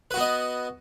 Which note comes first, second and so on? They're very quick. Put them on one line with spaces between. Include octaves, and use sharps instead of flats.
B4 F#4 B3 D#5